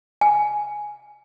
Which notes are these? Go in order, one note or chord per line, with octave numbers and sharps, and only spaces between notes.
G#5